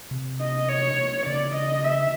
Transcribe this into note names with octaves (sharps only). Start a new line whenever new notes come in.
C3
D#5
C#5
C#3 D5
D#5
E5